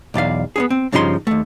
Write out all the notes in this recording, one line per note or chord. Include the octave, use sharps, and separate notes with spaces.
B1 E2 D5 F5
B3 C#4 G#4
C4
G2 C#3 F3 D#4 C5 C6
D#2 A3